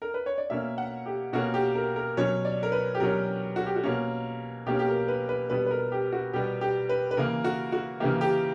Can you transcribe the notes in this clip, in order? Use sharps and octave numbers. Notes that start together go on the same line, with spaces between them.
A#4
B4
C#5
D5
B2 A#3 C#4 E5
F#5
G4
B2 A#3 C#4 F#4
G4
A#4
A#4
B2 F#3 C#4 C#5
D5
A#4
B4
G4
B2 F#3 C#4 A#4
F#4
G4
F#4
B2 A#3 C#4
B2 A#3 C#4 G4
G4
A#4
B4
B4
B2 G3 B3 B4
B4
A#4
G4
F#4
B2 G3 B3 G4
G4
B4
B4
C#3 E3 A#3 A#4
F#4
F#4
C#3 E3 A#3 G4
G4